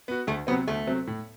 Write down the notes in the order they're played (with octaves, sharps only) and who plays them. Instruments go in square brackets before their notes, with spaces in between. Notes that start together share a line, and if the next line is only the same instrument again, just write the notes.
[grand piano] B3 F#4
[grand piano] D2 [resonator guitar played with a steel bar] A3
[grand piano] C3 F#3 C4 [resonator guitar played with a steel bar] B3
[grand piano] D2 [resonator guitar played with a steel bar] A3
[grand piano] C3 F#3 C4
A2